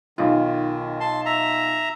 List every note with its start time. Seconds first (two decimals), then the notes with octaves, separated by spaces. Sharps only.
0.18 B1 D#3 F4
1.00 A5 C6
1.26 E5 A#5